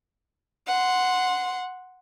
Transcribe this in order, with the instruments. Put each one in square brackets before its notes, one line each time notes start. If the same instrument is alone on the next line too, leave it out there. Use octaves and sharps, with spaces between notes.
[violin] F#5 C6